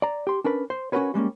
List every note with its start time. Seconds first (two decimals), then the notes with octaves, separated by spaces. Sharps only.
0.02 D5 A#5
0.27 G4 C6
0.44 C#4 D4 A#4 B4
0.70 C5
0.92 C#4 F#4 G4 A#4 B4 C#5
1.14 G3 G#3 A#3 C#4